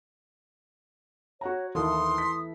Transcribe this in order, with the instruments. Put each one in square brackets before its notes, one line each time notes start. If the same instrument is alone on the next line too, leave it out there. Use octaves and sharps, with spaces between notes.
[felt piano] F#4 F#5 A#5 [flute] C#5
[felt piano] D#2 [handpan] E3 E4 A4 [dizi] C6 [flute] D#6
[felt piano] B6